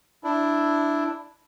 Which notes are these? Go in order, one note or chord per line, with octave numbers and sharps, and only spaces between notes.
D4 E4